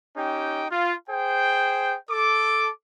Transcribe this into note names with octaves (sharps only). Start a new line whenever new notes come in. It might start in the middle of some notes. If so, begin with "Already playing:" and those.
C#4 D#4 G4 G5
F4
G#4 C5 G5
A4 D6